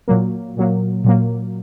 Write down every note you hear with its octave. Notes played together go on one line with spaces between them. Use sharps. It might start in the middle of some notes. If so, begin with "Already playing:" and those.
A#2 F#3 A#3
A#2 F#3 A#3
A#2 F#3 A#3